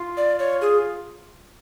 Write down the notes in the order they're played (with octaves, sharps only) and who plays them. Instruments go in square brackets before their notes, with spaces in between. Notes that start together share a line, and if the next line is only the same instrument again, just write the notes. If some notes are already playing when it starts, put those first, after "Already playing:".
Already playing: [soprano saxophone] F4
[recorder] D5
C#5
G#4